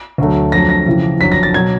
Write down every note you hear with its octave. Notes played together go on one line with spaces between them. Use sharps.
D2 D3 F#3 A3
F2 D3 F#3 A3 A#6
A#6
F2 C#3 E3
G1 F2 D3 F#3 B6
A#6
A6
B2 F#3 G#6